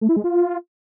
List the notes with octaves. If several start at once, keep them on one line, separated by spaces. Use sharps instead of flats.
A3
E4
G#3
F4